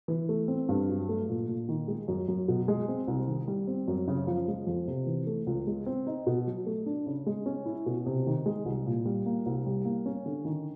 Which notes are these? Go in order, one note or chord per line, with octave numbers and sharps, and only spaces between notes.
E3
A3
C4
G2
F#3
A3
A#2
A#2
D#3
G#3
F#2
F#2
B2
G#3
C4
C2
D#3
G3
C4
F#2
C#3
F3
G#3
F2
C3
E3
A3
C#2
G#3
C4
D#4
B2
F#3
A3
D4
C#3
G#3
C#4
E4
B2
C3
D#3
G#3
C2
A#2
G3
A#3
C2
G3
A#3
C#4
D3
D#3